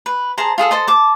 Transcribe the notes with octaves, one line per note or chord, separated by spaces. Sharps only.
B4
G#4 C5 A5 A#5
F4 G#4 A4 F5
A4 C5 D#5
A5 D6